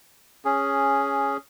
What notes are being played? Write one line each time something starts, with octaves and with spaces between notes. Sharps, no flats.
C#4 G#4